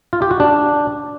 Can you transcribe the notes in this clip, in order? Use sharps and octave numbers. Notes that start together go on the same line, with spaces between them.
F4
G4
F#4
D4